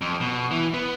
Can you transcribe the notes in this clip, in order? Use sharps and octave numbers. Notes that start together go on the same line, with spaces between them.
F2
B2
E3
B3